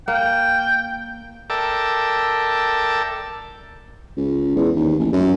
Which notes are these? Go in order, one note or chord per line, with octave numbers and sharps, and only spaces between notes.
A#3 G5
A4 A#4 D5 E5 G5 A5
C#2
E2
D#2
A1
F#2